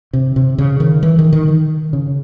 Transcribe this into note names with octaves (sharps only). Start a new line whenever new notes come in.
C3
C3
C#3
D#3
E3
D#3
D#3
D#3
C#3